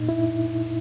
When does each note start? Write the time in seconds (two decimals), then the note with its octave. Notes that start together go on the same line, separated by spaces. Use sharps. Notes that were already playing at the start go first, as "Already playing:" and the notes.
Already playing: A#2 D#4
0.09 E4